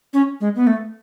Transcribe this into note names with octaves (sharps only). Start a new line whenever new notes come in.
C#4
G#3
B3
A3